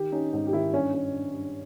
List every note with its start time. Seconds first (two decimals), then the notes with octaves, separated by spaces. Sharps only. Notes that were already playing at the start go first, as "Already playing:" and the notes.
Already playing: D#3 G4
0.12 C#4 D#4
0.33 G#2
0.47 G4
0.53 D#3 E4
0.73 G2 C#4
0.93 C#4
1.13 G2
1.33 G2